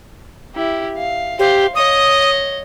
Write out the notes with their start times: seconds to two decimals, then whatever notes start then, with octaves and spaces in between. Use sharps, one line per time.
0.55 E4 G4
0.97 F5
1.39 G4 C5 F5
1.75 C#5 D#5 D#6